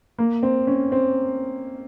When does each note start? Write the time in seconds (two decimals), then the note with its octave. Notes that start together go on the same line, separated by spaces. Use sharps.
0.19 A#3
0.43 C4
0.67 C#4
0.92 C4